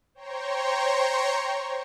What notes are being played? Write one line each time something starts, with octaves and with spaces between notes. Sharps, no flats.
C5 C#5 G5 A#5 C6 C#6